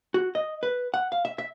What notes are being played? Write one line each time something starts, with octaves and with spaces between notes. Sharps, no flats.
F#4
D#5
B4
F#5
F5
E5
E5